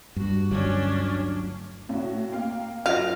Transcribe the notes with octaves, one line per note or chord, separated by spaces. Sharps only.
G2 F#4
G1 D2 F#3 C#4 D4
A2 F#4
A#3 F5 G5
F#3 F4 F5 A#6